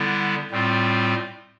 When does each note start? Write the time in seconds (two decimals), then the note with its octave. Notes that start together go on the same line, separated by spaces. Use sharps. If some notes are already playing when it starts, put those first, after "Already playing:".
Already playing: D3 G3 B3 E4
0.51 A2 G3 C4 F4